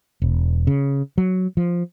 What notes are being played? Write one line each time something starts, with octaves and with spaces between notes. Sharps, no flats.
E1
C#3
F#3
F3